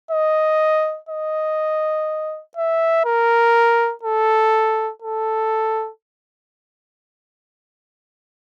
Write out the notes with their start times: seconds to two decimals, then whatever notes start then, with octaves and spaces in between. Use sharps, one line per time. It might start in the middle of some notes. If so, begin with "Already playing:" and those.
0.11 D#5
1.09 D#5
2.57 E5
3.05 A#4
4.03 A4
5.02 A4